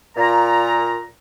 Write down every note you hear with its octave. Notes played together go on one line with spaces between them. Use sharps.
A#2 A#5